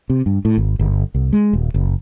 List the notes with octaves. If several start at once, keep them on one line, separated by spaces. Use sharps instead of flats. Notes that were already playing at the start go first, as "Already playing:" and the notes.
C3
G2
A2
G#1
G1
C2
G#3
D#1
F#1